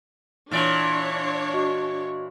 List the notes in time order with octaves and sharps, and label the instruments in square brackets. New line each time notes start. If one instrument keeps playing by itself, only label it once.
[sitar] A#2 E3 D5 [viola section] D4 C#5
[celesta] F#4 D#5 C#6